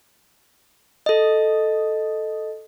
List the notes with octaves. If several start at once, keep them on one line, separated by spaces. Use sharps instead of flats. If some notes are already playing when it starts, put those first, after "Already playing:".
A4 D#5